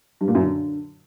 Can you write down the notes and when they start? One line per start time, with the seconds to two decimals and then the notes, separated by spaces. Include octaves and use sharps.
0.21 G2
0.28 A#2
0.35 F#2
0.42 D3